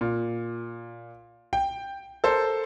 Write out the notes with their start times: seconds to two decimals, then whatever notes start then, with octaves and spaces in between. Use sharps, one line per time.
0.01 A#2
1.53 G5
2.24 A4 A#4 C5